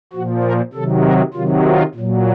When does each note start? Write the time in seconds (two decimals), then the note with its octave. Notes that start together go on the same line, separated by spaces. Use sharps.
0.13 A#2 F3 F#4
0.43 A#4
0.73 C3 D#3 F#3 A4
1.04 A#4
1.34 C3 D#3 F#3 F4
1.64 F4
1.95 A#2
2.00 F#3